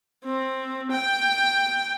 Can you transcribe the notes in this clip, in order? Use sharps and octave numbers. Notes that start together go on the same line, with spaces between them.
C4
G5